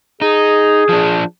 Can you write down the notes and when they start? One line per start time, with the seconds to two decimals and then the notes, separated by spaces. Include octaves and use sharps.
0.21 D#4 G#4
0.89 F3 D4